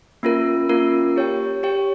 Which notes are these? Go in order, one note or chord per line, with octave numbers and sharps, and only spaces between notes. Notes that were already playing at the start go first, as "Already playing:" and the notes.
A#3 C#4 F4 A#4
A#3 C#4 F4 A#4
G4 C#5 G5
G4 C#5 G5